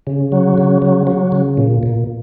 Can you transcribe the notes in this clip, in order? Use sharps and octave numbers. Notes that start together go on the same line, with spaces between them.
C#3
F#3
C#3
F#3
F#3
C#3
A#2
A#2